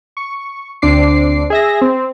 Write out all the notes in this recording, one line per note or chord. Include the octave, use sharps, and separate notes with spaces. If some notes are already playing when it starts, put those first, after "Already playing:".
C#6
D2 C4 D4 D6 C7
G#4 E5 A#6
C4